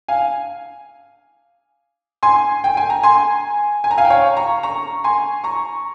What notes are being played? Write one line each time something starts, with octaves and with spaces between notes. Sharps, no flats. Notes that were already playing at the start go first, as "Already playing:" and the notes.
F5 G#5
G#5 C6
G5
G#5
A#5
G#5 C6
G#5
A#5
F5 G#5
G5
C#5 F5
A#5 C#6
A#5 C#6
G#5 C6
A#5 C#6